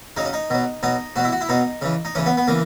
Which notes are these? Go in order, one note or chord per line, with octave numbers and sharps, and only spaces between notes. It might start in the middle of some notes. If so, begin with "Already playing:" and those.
C#3 F#3 D#4
C#4
D#4
B2 F#3
B2 F#3 D#4
B2 F#3 F#4
E4
F#4
E4
B2 F#3 D#4
C#3 E3
D#4
C#3 E3 C#4
B3
B3
C#3 E3 A#3